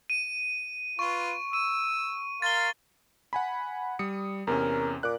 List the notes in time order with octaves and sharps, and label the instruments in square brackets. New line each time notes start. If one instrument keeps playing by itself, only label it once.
[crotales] D#7
[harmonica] F4 B4 [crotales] C#6
[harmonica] E6 [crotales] D#7
[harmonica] A#4 F5 C6 [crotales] A6 G7
[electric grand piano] F#5 G#5 B5
G3 D#6 C#7
[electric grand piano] E2 C3 C#4 [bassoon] A#4
[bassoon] A#2 [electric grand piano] D6 F#6